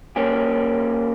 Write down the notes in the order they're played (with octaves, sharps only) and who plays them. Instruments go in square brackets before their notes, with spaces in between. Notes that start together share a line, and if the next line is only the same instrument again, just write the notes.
[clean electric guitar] A#3 C#4 G4